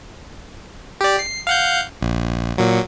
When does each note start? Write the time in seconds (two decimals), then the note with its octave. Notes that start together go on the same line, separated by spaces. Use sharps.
1.01 G4 D5
1.19 C7
1.47 F5 F#5 G6
2.01 A#1
2.58 A#2 F#3